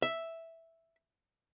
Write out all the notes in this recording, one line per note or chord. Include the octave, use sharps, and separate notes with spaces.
E5